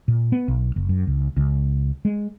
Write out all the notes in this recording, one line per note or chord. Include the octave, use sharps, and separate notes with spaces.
A#2
B3
B1
F#1
F#2
C#2
C#2
G#3